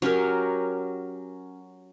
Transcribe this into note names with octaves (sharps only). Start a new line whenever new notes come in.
F#3 C#4 G4 A#4